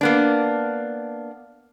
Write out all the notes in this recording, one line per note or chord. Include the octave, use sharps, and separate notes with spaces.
A#3 B3 D4